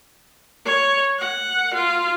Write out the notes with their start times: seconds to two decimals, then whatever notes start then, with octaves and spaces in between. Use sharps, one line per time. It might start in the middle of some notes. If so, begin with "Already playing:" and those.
0.66 C#5
1.19 F#5
1.75 F4